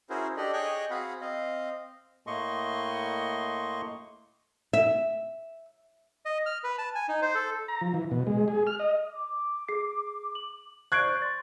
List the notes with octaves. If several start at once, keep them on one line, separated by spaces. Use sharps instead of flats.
C#4 E4 F#4 G#4 A#4 C5
D4 G4 A4 D5 D#5
G#4 C#5 D#5 G5 C#6 F#6
C4 F#4 G#4 F5 F#5 B5
C4 D#5 F5
A2 A3 A#3 D#5 C6 C#6
E5
D#5
F6
B4
A5
G#5
D#4
C5
A4
A#5
F3
E3
B2
G#3
G#4
F6
D#5
D6
G#4 C7
F#7
C5 D5 C#6 F#6 G#6 C7 D7
C6 A6